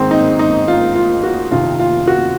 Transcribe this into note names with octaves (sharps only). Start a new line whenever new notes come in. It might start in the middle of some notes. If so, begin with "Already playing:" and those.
Already playing: G#2 D#3 C4
D#4
D#4
F4
F4
F#4
F2 C3 D#3 F4
F4
F#4